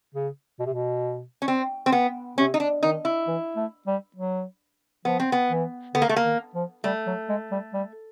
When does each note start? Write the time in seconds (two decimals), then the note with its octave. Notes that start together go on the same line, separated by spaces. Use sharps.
0.15 C#3
0.59 B2
0.66 C3
0.73 B2
1.42 C#4
1.48 C4
1.86 C4
1.92 B3
2.38 C3 C#4
2.54 D#4
2.60 D4
2.82 D#3 D#4
3.05 E4
3.27 E3
3.56 A3
3.87 G3
4.16 F#3
5.05 F3 B3
5.20 C4
5.32 B3
5.50 E3
5.95 D3 B3
6.02 A#3
6.09 A3
6.16 A#3
6.24 D#3
6.55 F3
6.84 G3 A3
7.07 F#3
7.29 G#3
7.52 G3
7.74 G3